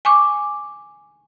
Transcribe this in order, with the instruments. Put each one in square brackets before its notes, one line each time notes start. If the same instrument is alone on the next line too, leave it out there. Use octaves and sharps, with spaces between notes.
[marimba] G#5 C#6 D6